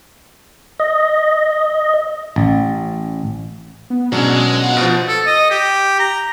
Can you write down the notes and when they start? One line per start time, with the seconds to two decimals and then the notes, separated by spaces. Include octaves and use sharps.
0.80 D#5
2.36 A1
3.90 B3
4.12 G#2 B2 F#3 G#3 C#4 D4
4.35 G#3
4.60 F4 F#5
4.77 B2 F3
5.08 A4
5.26 D#5
5.50 G4
5.99 A#5